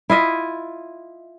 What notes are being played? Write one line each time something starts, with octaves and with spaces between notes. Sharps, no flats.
E4 F4 D#5 E5